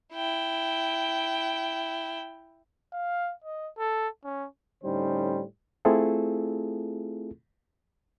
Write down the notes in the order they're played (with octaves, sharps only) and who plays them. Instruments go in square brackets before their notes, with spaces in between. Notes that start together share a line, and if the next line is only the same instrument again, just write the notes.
[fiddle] E4 G5
[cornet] F5
D#5
A4
C#4
[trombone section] A2 D3 G3 C#4 D#4 C5
[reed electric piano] A3 C4 E4 F4 G#4 A4